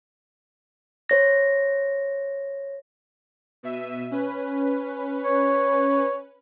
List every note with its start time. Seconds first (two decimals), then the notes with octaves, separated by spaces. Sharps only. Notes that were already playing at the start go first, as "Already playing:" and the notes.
1.09 C5 C#5 A#6
3.63 B2 E5 D#7
4.11 C#4 B4
5.22 C#5